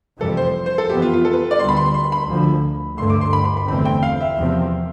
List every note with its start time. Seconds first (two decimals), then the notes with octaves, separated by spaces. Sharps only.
0.20 F1 F2 E3 G3 A4
0.37 C5
0.66 C5
0.78 A4
0.89 F2 E3 B3 G4
1.02 F4
1.13 F4
1.25 A4
1.33 B4
1.51 D5
1.59 D2 D3 G3 B3 C6
1.69 B5
1.76 C6
1.94 C6
2.12 B5
2.29 D2 D3 F3
2.98 G2 D3 A3 C6
3.10 D6
3.21 C6
3.33 B5
3.45 B5
3.57 B5
3.68 F1 E2 D3 A3 C4 B5
3.85 G5
4.03 F5
4.21 E5
4.37 E2 C3 F3 C4